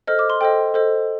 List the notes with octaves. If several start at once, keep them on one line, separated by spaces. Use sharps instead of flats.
A4 C5 D#5 F6
D6
C6
A4 C5 D#5 G5
A4 C5 D#5